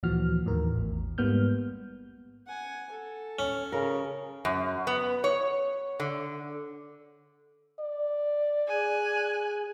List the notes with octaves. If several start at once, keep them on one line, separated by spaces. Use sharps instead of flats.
D2 A#2 E3 F3 F#4 F6
D#2 A2 D#3 E3 A#4
A1 E2
G#2 G3 A#3 B3 F6 G6
F#5 G#5
A4
C#4
C#3 A#4
F#2
B3
C#5
D3
D5
G#4 G#5 F#6